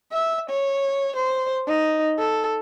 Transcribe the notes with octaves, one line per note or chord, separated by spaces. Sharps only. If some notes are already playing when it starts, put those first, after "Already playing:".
E5
C#5
C5
D#4
A4